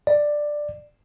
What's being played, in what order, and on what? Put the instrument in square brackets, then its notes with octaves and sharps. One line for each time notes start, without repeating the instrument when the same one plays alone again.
[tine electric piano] D5